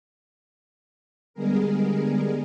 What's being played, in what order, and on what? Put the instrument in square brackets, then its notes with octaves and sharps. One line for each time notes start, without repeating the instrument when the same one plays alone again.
[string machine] D3 G3 G#3 B3 G#4 A#4